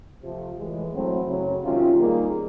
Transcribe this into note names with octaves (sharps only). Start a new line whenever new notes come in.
C3 F3 A3
A2 E3 G#3
F#3 A3 C4 E4
F#2 C#3 F#3
C3 D#3 G#3 C#4 F4
D#3 G3 A#3 D#4 G#4